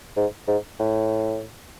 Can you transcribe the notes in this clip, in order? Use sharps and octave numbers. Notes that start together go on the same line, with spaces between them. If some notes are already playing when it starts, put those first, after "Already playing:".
G#2
G#2
A2